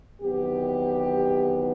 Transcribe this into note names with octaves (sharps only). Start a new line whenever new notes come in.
E2 C3 D#3 F#3 B3 G4